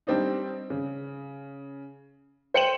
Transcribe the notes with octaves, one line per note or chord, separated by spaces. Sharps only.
G3 C4 D4 D#4
C#3
C5 G5 C#7 D#7 E7 F#7